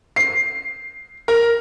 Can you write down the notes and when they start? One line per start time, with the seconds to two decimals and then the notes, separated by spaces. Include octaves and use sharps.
0.16 C7
1.28 A#4